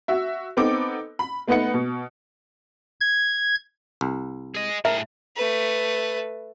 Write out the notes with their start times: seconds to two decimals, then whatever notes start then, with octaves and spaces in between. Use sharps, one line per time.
0.08 F#4 E5
0.57 B3 C4 D#4 A4 D6
1.19 B5
1.47 A3 B3 D#4 B4 F#5 C#7
1.74 B2
3.01 G#6
4.01 C2
4.54 G#4 D#5
4.85 A2 G#4 A#4 E5
5.36 A3 B4